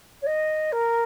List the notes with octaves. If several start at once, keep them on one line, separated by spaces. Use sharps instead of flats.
C#5
D#5
A#4